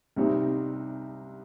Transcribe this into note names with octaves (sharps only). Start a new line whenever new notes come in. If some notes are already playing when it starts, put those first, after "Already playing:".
C2 C3 G3 C4 D#4